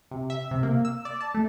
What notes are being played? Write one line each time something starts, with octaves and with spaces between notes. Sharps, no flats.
C3
E5
C3
A#3
E6
D5
A5
A3